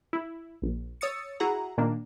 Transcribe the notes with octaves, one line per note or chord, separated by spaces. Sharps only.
E4
A#1
C#5 D#6 E6 A6 C#7
E4 F#4 G#4 F#5 A#5
A#2 D#3 A#3 D4